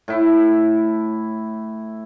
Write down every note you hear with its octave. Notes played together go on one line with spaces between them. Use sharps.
A2 E4